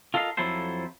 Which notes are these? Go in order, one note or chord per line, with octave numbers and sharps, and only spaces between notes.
F4 A4 A#4 D#5 F5
F2 F3 F#3 E4 A4 C5